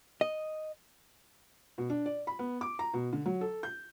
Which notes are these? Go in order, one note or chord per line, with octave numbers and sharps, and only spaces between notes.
D#5
B2
D4
D5
B5
B3
D6
A#5
B2
D3
F#3
A4
G6